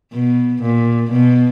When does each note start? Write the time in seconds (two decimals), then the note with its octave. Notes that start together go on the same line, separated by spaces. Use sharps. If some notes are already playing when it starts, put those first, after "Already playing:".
0.13 B2
0.62 A#2
1.11 B2